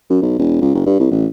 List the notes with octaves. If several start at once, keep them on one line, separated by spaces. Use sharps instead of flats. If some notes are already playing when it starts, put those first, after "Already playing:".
F#2
B1
E1
C#2
F#1
G2
C2
A1